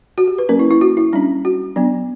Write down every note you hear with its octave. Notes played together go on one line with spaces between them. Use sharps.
F#4
G4
B4
F#3 A#3 C#4 A#4
E4
E4
F#4
E4
G3 C#4 D4
F#4
F#3 B3 D4